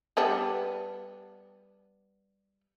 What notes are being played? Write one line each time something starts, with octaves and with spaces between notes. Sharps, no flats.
G3 B3 D4